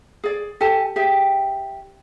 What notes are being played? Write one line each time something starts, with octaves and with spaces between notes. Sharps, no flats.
G#4 D5
G4 A4 G#5 A5
G4 G#4 E5 G5